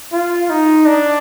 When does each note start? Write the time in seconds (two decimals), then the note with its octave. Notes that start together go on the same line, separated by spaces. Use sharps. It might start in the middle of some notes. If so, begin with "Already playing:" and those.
0.13 F4
0.50 D#4
0.86 D4